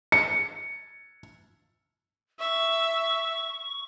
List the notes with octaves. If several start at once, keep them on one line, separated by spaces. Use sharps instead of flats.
C#7
E5 C#6